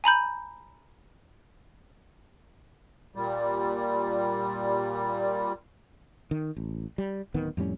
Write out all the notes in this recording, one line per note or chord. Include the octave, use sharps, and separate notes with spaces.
G#5 A#5 B5 G6
A#2 G3
D#3
A1
G3
D1 D#3 B3
F2 A2 G3 C#4